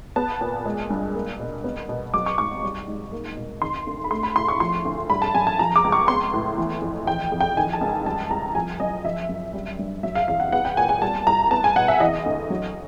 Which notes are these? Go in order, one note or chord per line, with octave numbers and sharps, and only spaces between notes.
B3 A5
A#2
G#3
G2
A#3
B2
B3
B2
F#3 D6
C#6
G#2 C#6
G3
G#2
A#3
B2
D#3 C6
D2
B5
A3 C6
B5
A2 C6
C#6
F3 C6
D2
G3 B5
A5
F#2 G#5
A5
F3 A#5
D6
C#2
C#6
B3 C6
A2
E3
F2
E3 G5
F2
G5
D#3 G#5
A5
C#2
G3 A5
C2 A#5
F3 G#5
F#2 D#5
F3 E5
F#2
G3
G2
F#3 E5
F5
E2 F5
F#5
B3 F#5
G5
A#2 G#5
G#5
G3 A5
C2 A#5
B3 A5
G#5
B2 F#5
E5
E3 D#5
D2
F#3